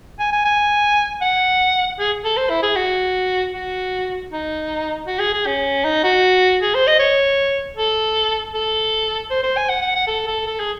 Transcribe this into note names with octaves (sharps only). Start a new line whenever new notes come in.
G#5
G#5
G#5
F#5
G#4
A4
C5
E4
G#4
F#4
F#4
D#4
F#4
G#4
G#4
C#4
D#4
F#4
G#4
C5
D#5
C#5
A4
A4
C5
C5
G#5
F#5
F#5
F#5
A4
A4
A4
G#4